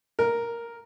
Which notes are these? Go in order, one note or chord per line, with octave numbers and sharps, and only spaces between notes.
A#4